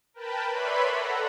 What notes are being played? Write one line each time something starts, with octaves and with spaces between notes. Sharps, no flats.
A#4 B4 G5 A5 B5
B4 C#5 D5 E5 B5 C6
A4 F#5 A#5